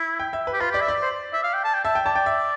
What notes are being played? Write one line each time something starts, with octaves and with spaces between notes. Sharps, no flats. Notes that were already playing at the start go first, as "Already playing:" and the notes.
Already playing: E4
G5
E5
B4
G4
F4 B4
G4
D5
E5
D5
C5
E5
F5
G5
A5
G5
E5 A5
G5
D5 A5
G5
E5